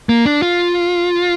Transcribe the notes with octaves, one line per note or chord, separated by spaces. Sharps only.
A#3
D4
F4